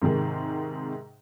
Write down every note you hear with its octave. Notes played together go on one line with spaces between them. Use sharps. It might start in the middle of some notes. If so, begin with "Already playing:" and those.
G#2 C3 D#3 G#3